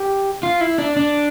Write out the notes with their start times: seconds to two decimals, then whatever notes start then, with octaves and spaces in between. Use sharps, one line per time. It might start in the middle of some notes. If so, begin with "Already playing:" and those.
Already playing: G4
0.43 F4
0.61 E4
0.78 D4
0.96 D4